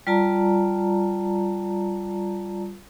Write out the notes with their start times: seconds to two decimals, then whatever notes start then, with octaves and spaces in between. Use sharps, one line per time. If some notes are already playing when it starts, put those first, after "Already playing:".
0.07 G3 F4 D5 A5 A#5